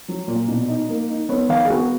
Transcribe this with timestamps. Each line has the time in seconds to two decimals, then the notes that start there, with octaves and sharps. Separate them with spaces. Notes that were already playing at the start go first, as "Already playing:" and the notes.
0.08 F#3
0.28 A#2
0.48 B2
0.68 D#4
0.89 A#3
1.09 D#4
1.29 B3 C#5
1.49 D#3 F5
1.64 G#4
1.70 B3 F#4